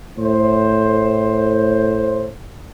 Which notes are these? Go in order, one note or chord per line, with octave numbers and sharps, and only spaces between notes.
A2 C5